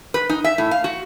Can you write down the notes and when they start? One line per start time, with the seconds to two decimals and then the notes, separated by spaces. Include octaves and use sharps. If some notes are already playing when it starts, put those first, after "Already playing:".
0.14 B4
0.29 D#4
0.44 E5
0.58 A2
0.71 F5
0.84 F#4